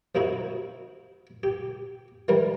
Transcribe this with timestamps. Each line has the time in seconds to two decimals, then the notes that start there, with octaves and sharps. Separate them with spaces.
0.15 C3 A#3 D#4 E4 F#4
1.43 G4
2.28 D#3 E3 G3 A#4